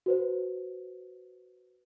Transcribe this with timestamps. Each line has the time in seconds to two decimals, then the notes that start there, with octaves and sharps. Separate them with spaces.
0.06 F#4 B4 C5